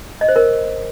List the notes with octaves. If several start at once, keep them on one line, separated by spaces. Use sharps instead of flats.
D#5
C5
A#4